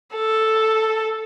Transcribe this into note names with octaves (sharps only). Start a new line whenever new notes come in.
A4